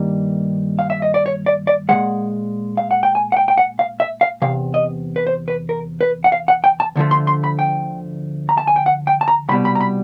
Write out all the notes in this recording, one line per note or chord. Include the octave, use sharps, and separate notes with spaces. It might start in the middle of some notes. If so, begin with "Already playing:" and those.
Already playing: G2 D#3 G3 A#3
F5
E5
D#5
D5
C#5
D5
D5
A#2 F3 G#3 F#5
F5
F#5
G5
G#5
F#5
G5
G5
F#5
F5
E5
F5
E2 C3 F5
D#5
B4
C5
B4
A#4
B4
F#5
F5
F#5
G5
A5
D2 D3 F3 A3
C6
C6
B5
G5
A#5
A5
G#5
G5
F#5
G5
A5
A#5
C2 B2 G3 B5
B5
A#5
B5